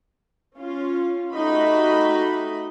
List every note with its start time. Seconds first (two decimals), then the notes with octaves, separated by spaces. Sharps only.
0.57 C#4 F4
1.33 A3 D#4 F#4 G4 D#5 B5